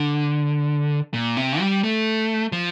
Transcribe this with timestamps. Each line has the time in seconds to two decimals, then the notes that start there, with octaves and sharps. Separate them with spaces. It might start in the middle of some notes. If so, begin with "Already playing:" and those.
Already playing: D3
1.14 A#2
1.37 C3
1.60 G3
1.83 A3
2.52 F3